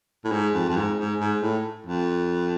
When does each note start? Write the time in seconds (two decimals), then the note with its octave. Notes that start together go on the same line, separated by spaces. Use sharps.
0.25 A2
0.32 G#2
0.54 F2
0.69 F2
0.77 G#2
0.98 G#2
1.20 G#2
1.42 A2
1.86 F2